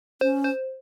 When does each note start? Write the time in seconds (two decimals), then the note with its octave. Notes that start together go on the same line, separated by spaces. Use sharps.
0.21 C#4 C5
0.44 C5